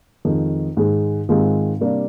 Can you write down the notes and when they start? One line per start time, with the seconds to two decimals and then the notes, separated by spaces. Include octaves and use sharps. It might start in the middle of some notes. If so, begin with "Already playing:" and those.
0.25 F2 D#3 G#3
0.77 G#2 D#3 G#3
1.29 G#2 D#3 G#3 C4 F4
1.81 C3 G3 A#3 D4